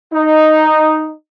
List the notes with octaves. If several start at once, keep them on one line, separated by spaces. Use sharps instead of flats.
D#4